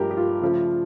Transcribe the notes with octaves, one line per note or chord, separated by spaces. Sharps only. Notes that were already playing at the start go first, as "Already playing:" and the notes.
Already playing: G2 F3 A3 G4 A#4
G4
F4
C#3 F3 A3